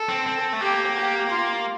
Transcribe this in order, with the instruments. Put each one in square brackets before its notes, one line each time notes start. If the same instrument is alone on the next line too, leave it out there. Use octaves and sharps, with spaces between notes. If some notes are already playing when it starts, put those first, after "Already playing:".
Already playing: [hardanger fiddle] A4
[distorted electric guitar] C4
C4
A3
[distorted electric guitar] A#3 [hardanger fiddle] G4
[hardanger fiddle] G4
F4